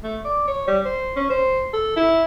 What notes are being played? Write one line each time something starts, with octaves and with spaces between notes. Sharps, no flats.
A3
D5
C#5
G3
C5
C#4
C5
A4
E4